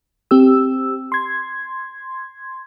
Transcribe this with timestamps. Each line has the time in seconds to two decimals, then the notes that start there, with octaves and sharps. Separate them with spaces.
0.31 C4 G4 E6
1.12 C6 G#6